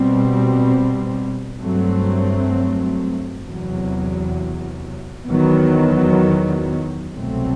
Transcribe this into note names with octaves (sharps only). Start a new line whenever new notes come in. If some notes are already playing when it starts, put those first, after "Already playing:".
Already playing: B2 G3 C4
G2 F#3 A3 C4
E2 C3 F#3
E2 D#3 F#3 B3
C2 B2 F#3 A3 C4